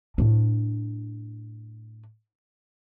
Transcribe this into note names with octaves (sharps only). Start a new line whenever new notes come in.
A2 D4